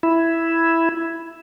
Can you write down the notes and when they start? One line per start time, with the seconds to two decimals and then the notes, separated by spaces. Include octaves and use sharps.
0.03 E4